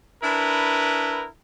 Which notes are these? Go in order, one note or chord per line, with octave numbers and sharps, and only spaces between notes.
D4 E4 A#4 B4